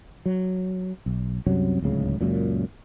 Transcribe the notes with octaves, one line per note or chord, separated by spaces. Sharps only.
F#3
B1
C2 F#2 C3 F#3
D1 C#2 C#3
C#2 F#2 A#2